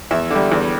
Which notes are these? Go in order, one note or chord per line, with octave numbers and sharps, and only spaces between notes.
E2 E5
D3 G3
E2